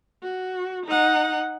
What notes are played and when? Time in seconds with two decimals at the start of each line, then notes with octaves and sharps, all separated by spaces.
0.23 F#4
0.86 D#4 F#5